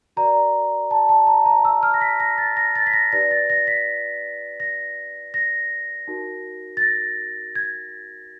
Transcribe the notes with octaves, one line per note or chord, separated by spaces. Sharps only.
F#4 A#4 D5 A#5
A5
A5
A#5
A#5
E6
F6
A#6
B6
A#6
A6
A#6
A6
B6
A#6
D#4 G4 B4 D5 A#6
A6
A#6
B6
A#6
A#6
D#4 F#4 A#4
A6
A#6
G#6